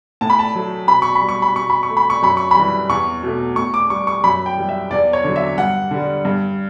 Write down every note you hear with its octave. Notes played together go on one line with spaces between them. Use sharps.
A2 A5
B5
A5
F#3 A3
B2 B5
C#6
B5
G3
C#6
B5
B2 C#6
B5
C#6
A3
B5
C#6
F#2 B5
C#6
B5
E3 G3
E2 C#6
B2 A3
A2 C#6
D6
G3 C#6
C#6
F#2 B5
G5
E3 G3
E5
E2 D5
C#5
D3 F#3
E5
G2 F#5
D3 G3
G2